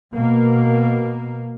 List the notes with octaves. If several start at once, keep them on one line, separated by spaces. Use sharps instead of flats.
B2 A#3